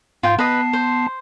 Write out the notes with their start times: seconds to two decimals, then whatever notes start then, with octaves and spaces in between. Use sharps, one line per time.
0.23 G#2 F4 G5
0.39 B3 B4 D#5 A5 C7
0.73 C5